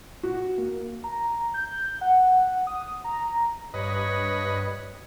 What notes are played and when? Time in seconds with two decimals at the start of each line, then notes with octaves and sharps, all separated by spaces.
0.23 F#4
0.58 A#3
1.04 A#5
1.54 G6
2.01 F#5
2.67 D#6
3.04 A#5
3.74 G2 B4 C#5 D#5